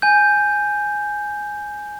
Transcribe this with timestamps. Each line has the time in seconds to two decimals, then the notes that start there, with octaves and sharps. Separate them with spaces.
0.02 G#5 G6